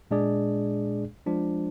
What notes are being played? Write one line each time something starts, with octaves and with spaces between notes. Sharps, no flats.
A#2 G#3 D4 G#4 D5
F3 G#3 D4 F4 C5